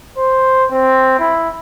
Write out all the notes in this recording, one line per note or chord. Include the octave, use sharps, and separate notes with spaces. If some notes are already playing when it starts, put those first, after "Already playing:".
C5
C4
E4